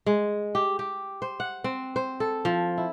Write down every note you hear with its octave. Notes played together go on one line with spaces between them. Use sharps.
G#3
G4
G4
C5
F#5
C4
C5
A4
F3
E4